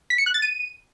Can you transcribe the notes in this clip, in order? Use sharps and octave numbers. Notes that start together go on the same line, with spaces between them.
B6
C#7
F#6
A6
D#7